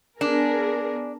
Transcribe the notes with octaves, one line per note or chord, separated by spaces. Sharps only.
B3 D4 G#4 A#4